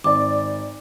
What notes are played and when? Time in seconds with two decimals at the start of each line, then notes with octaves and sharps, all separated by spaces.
0.04 G#1 D5 D6